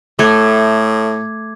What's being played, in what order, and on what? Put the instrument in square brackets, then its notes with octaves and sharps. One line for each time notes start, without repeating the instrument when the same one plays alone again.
[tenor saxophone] A2 [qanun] A3 [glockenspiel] D6 G#6